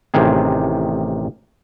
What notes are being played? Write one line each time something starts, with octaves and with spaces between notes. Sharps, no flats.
A1 C3 D#3 G#4